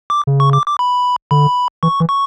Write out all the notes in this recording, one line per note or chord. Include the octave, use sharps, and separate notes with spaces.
D6
C#3
C#6
D6
D6
B5
D3 B5
E3 C#6
E3
C#6